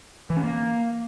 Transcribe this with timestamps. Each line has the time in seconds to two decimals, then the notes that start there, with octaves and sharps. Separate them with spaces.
0.30 E3
0.37 C#4
0.43 A#3